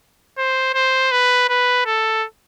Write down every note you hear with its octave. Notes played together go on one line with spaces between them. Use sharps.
C5
C5
B4
B4
A4